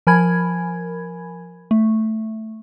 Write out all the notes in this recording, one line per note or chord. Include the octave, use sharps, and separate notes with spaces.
F3 A#4 G#5 B5 G#6
A3